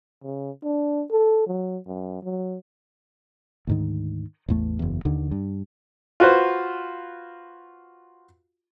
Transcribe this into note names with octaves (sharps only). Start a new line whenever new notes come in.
C#3
D4
A4
F#3
F#2
F#3
D2 G#2 D#3
A1 E2 A3
F#1 E2
D#2 D3 D#3
G2
F4 F#4 B4 C5